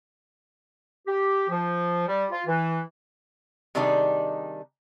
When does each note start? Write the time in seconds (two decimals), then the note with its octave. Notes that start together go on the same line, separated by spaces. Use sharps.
1.07 G4
1.50 F3
2.08 G3
2.31 F4
2.47 E3
3.75 C3 D#3 G3 D4 D#4 G#4